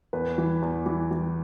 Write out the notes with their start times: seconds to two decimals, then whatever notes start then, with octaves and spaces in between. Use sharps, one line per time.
0.13 E2 B4
0.38 E3
0.62 E2
0.86 E3
1.11 E3